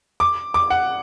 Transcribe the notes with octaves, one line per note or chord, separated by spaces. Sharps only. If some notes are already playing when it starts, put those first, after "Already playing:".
D6
D6
F#5